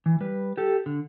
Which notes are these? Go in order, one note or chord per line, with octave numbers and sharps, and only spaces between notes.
E3
G3 B4
G4 A4
D3